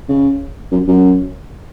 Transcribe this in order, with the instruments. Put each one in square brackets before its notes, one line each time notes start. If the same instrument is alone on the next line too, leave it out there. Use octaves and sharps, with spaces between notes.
[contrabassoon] C#3
F#2
F#2